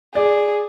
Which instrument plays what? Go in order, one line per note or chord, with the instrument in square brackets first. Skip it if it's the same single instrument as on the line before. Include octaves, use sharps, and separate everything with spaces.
[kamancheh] G#4 [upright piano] D5